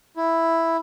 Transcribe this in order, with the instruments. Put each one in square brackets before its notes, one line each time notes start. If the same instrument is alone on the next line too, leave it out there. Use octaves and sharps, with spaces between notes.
[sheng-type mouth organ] E4